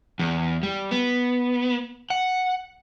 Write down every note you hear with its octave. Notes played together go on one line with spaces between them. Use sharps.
E2
G3
B3
F#5